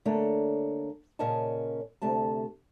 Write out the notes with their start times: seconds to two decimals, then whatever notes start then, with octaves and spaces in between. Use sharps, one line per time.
0.05 D3 A3 A#3 D4 C#5
1.19 A#2 C#3 A#4 C#5 D#5 A5
2.02 D2 C3 A3 A5